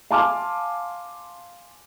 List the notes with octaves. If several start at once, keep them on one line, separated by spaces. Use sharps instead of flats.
F5 G#5 A5 C6 D6 F6